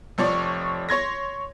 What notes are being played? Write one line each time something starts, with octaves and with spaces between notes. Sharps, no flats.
F1 F3 C#5 D5 C#6
C#5 C6 G#6 A#6